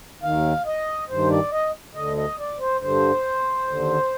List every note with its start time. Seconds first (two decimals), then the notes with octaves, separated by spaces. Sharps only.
0.23 D#2 D#3 F5
0.66 D#5
1.09 G2 D#3 C5
1.31 D5
1.52 D#5
1.95 D2 D3 D#5
2.17 D#5
2.39 D5
2.59 C5
2.81 G2 D3 C5
3.67 D#2 D3